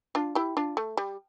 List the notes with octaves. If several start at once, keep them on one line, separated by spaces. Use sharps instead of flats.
D4 F4
E4 G4
D4 F4
A3
G3